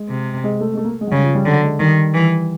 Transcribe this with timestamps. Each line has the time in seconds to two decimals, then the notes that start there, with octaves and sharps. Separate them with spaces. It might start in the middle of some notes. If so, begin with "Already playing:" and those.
Already playing: G#3
0.09 C3
0.44 G#3
0.61 A3
0.74 G#3
0.77 A3
0.84 A#3
0.89 A3
1.01 G#3
1.07 F#3
1.12 C#3 G3
1.23 F3
1.35 G3
1.46 D3 F#3
1.63 G#3
1.80 D#3 G3
2.14 E3